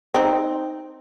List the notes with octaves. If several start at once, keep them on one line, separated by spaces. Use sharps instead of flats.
C4 D#4